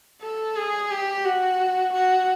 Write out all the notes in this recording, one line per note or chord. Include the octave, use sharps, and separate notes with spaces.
A4
G#4
G4
F#4
F#4